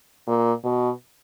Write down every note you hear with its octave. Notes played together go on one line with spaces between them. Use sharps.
A#2
B2